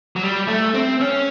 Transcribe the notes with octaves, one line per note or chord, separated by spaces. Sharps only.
F#3
G3
A3
C4
C#4